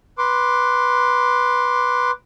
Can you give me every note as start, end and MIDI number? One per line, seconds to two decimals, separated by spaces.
0.18 2.11 71
0.18 2.11 84
0.18 2.11 86